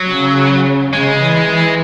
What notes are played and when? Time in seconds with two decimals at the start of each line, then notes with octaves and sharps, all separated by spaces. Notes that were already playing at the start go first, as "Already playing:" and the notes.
Already playing: F#3
0.08 C#3
0.93 C#3 G#3
1.21 E3
1.50 E3